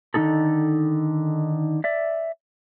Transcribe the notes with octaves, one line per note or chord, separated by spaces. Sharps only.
D3 D#3 G3 D#4 G#4 A4
D5 E5